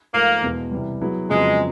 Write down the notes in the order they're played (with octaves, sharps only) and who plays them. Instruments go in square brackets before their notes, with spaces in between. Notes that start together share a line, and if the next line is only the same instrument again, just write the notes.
[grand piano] G#2 F3 A3 [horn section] A#3
[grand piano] E2 B2 G#3
C2 C3 E3 G3
F#3 B3 E4 G#4
[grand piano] F2 C#3 F#3 B3 [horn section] G#3